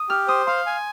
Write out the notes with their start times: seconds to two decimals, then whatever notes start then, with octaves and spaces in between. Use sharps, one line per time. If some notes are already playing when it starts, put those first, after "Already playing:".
Already playing: D#6
0.09 G4 F6
0.28 C5 D#6
0.47 F5 C6
0.66 G#5